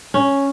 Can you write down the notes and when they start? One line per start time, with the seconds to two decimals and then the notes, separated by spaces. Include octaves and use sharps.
0.14 C#4